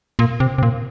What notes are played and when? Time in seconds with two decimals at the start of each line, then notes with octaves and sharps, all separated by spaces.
0.19 A#2
0.40 C3
0.58 C3
0.63 A#2